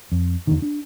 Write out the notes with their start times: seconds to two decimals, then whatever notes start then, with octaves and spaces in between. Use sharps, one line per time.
0.12 F2
0.47 E2 D3 D#3
0.62 D4